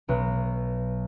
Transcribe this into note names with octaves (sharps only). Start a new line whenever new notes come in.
B1 F#6